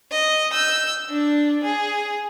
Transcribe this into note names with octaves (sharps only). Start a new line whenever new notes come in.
D#5
E6 G6
D4
G#4